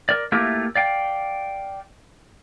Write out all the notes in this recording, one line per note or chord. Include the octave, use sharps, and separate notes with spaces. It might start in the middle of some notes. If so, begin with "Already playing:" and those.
A#4 D5
A3 A#3 E4 F4 G4 A#4
D5 F5 G5